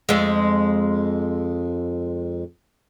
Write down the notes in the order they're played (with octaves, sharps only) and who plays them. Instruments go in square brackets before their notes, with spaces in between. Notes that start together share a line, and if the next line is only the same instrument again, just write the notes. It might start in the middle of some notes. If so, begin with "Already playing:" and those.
[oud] F2 G#3